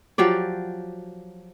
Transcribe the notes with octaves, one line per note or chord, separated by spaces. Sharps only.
F3 F#3 G4 D5